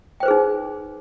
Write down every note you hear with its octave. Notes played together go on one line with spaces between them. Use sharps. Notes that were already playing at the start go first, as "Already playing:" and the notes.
D#4 G#4 B4 C5 G5